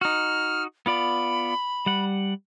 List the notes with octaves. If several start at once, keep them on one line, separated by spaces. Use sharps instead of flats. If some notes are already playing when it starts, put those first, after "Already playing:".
D#4 F#4 F6
B3 F4 D5 B5
G3 F#5